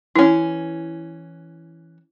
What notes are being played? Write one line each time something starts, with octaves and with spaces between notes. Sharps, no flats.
E3 C#4 E4